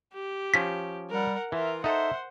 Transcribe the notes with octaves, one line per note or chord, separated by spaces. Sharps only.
G4
F3 C#4 B6
G3 A#4 F#5
E3 F4 A#4 E5
D#4 A4 C5 E5 F#5